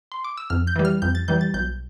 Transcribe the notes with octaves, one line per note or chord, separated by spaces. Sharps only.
C6
D6
E6
F2 F6
G6
E3 G3
F6
F2 G6
A6
E3 G3 G6
A6
B1 G6